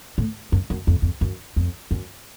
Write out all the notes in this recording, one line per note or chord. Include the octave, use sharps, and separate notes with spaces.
A2
F#2
F#2
F2
F2
F#2
F2
F#2